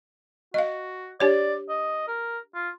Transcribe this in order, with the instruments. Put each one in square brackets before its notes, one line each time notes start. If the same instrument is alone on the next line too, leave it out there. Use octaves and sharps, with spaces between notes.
[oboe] F#4 [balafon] D#5 F5
[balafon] D4 G4 C#5 [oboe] D5
[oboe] D#5
A#4
F4